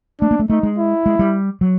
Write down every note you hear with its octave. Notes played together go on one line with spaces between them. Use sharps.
A3 D4
A#3
A3
A3 D#4
G#3
E4
G#3
G3
F#3